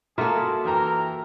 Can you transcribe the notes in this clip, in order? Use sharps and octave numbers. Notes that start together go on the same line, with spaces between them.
A#3 F4 F#4 G#4 A4 E5
E3 A#4 G5 A#5